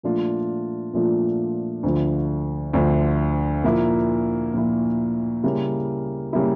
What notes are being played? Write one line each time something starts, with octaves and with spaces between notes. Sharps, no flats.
A#2 F3 A3 D4 F4
A#2 F3 A3 D4 F4
D2 D3 F3
D2 D3 F3
A#2 F3 A#3 E4
A#2 F3 A#3 E4
C#3 G3 A#3 E4
C#3 G3 A#3 E4